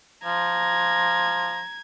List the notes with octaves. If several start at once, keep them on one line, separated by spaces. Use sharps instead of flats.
F3 A#5 G#6